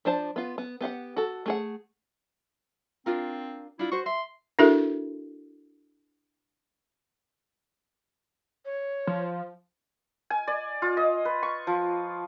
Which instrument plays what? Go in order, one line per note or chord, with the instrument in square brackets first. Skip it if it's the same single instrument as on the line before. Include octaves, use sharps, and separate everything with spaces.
[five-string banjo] F3 D4 C5 A5
B3 F4
B3
B3 G4 F5 F#5
F#4 A4
A3 G#4 F#5
[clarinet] C4 [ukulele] D4 F4 A#4
[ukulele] D4 F4 [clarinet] E4
[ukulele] F#4 C5 [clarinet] C#6
[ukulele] E5 [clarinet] C6
[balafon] D4 E4 F#4 A4 A#4 E5
[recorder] C#5
[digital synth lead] F3
[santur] G#5
D5
F4
D#5
B4
C#6
F3